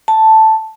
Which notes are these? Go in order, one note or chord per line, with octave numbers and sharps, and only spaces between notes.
A5